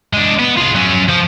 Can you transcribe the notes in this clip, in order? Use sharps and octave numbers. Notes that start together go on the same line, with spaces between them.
G#3 D4
B3
F4 G#4
F#3 C#4
F3